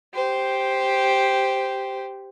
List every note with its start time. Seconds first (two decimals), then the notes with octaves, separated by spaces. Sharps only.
0.14 G4 C5